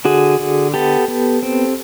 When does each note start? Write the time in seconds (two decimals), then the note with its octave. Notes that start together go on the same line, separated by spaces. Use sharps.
0.05 D3 F#4 G#4
0.40 D3
0.74 B3 G4 A4
1.08 B3
1.43 C4